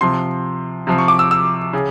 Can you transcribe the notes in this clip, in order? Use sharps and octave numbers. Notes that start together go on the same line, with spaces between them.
C3 F3 C6
C3 F3
C#6
D6
E6
E6
C#3